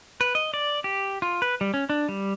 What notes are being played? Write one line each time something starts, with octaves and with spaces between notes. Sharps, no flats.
B4
D#5
D5
G4
F4
B4
G3
C#4
D4
G3